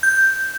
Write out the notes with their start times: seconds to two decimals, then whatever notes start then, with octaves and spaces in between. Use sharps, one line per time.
0.03 G6